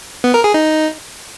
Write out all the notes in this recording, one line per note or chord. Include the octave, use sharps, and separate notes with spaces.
B3
A#4
G#4
D#4